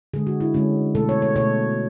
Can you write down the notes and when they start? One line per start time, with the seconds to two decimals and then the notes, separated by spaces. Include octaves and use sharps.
0.14 D3 G#3 G#4
0.27 F#4
0.40 E4
0.54 D3 G#3 C#4
0.95 B2 A3 A4
1.09 C#5
1.22 C#5
1.36 B2 A3 C#5